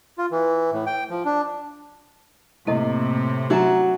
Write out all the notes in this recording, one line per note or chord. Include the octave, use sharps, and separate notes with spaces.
F4
E3
A2
G5
F3
D4
A2 C3 A#3 E4 A4 D#5
F#3 D4 F#4 E5 F#5 G#5 A#5